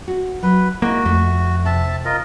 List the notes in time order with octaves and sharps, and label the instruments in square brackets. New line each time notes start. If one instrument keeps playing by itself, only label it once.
[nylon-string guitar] F#4
[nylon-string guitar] F#3 [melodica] B4
[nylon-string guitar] G#3 E4 [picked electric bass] A#3 [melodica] F#4
[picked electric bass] F2 [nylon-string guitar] A3 E5
[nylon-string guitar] C3 [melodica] E5 A5
[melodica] F4 A#4 D#5